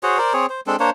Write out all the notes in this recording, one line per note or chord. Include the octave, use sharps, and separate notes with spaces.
F#4 G#4 C5 C#5
A#4 C5 D5
C4 G#4 C#5
C5
G#3 C4 D4 A4
A#3 D4 C5 C#5